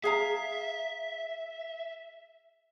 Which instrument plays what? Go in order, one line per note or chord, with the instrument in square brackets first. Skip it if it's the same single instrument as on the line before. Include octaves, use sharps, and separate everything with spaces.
[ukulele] G#4 F5 A#5 [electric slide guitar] E5